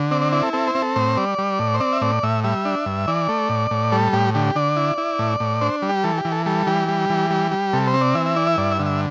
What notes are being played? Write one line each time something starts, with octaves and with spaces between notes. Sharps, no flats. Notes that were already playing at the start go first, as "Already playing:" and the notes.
Already playing: D3
C4 D5
D5
E4 D5
A4
C4 A4
C5
C4
A4
A2 C5
G3 D5
G3
A2
C5
C4 D5
E5
A2 D5
A2 E5
G3 E5
D4
G2
E3 D5
A3
A2
A2
G3 A4
A2 G4
D3 G4
D3 D5
E4
E4
A2
A2
D4 C5
G3
G4
E3 A4
G4
E3
A4
G3 A4
E3 G4
G3
E3
G3
G3
C3 A4
C5
C4
D5
E3 E5
E5
E4 D5
E5
G2 D5
E5
D3
E5